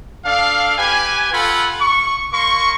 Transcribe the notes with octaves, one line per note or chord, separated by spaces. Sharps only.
D4 A4 F5
G4 B4 G#5
F4 A4 F#5 B5
C#6
A#3 C6 C#6